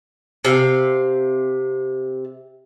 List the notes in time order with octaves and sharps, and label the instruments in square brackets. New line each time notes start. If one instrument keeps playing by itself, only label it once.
[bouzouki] C3 F5